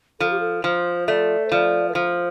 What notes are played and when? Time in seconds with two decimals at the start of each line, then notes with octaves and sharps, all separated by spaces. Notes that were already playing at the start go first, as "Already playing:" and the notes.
0.20 F3 A4
0.31 G4
0.40 A4
0.64 F3 C5
1.08 A3 D5
1.46 C5
1.52 F3 D5
1.89 B4
1.95 F3 C5